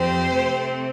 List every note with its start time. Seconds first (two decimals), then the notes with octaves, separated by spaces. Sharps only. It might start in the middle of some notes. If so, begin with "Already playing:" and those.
Already playing: F2 F3 C4 G4 C5
0.31 C3 A3 C4